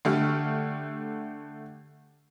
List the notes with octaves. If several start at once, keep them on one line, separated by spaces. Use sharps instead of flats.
D3 A3 G4 F6